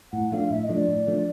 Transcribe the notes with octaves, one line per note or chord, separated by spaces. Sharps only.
A2 F#5
F3 A3 D4 F5
A2 E5
D#5
F3 A3 D4
D5
A2
F3 A3 D4